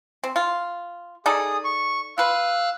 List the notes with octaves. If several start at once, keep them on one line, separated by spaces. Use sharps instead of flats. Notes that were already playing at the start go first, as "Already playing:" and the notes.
C4
F4
D#4 G#4 A4 D5 D#6
C#6
F4 B4 F5 E6 F#6